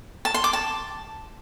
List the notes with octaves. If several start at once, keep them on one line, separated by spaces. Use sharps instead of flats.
A5
C6
D6
A5